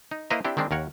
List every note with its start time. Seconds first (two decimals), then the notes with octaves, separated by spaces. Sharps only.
0.11 D#4
0.30 A#3 E4 B4 C5 D#5 A#5
0.45 C4 D4 E4 G4
0.57 D#3 G#3 C4 D4
0.71 D#2 A#4 C#5 F#5